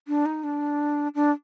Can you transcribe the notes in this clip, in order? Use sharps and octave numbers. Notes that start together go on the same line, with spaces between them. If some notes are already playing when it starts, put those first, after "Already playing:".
D4
D#4
D4
D4